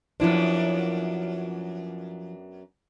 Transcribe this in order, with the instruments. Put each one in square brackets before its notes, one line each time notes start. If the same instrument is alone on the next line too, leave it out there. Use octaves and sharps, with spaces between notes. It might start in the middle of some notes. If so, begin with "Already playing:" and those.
[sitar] F#2 B3 D4 [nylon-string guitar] F3 E4 C5